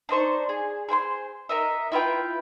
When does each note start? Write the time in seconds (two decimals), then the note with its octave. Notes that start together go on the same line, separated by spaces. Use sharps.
0.09 D4 D#4 C5 C#6
0.49 G#4
0.89 G#4 C5 G5 C6
1.49 D#4 A#4 D#5 E5
1.92 E4 F4 B4 G5